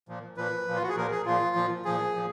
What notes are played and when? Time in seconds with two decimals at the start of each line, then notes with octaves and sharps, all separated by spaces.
0.09 A#2 F3
0.37 A#2 F3 B4
0.68 A#2 F3
0.76 F4
0.83 F#4
0.89 G#4
0.97 A#2 F3 A#4
1.12 G#4
1.26 A#2 F3 F4
1.56 A#2 F3
1.85 A#2 F3 G#4
2.15 A#2 F3